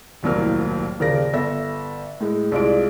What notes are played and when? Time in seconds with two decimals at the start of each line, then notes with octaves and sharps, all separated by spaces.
0.23 D#1 C2 A2 F#3 A#3 F6
0.99 D#1 C#3 A#4 D5 A#6
1.33 G1 A4 E5 E6 A#6
2.21 A2 G#3
2.52 C2 G#3 F4 D5 D7